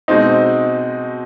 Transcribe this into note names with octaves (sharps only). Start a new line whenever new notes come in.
B2 G#3 C4 D#4